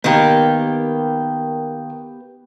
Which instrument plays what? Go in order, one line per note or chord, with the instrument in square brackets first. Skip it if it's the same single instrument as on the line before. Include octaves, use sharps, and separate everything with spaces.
[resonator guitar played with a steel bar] D#3 A#3 [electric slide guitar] B3 G4